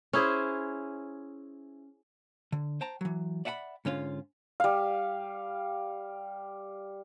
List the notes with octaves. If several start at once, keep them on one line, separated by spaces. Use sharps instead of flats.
C#4 E4 G#4 C5
D3
C5 G5 A5 A#5
E3 F#3
D5 E5 F#5 G#5 B5
G#2 D3 C#4 F4
G3 F5